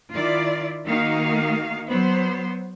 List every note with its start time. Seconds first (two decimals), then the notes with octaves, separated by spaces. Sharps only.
0.12 D#3 E4 F4 D5
0.86 D#3 A#3 D#4 F#4 F5
1.89 F#3 B3 C5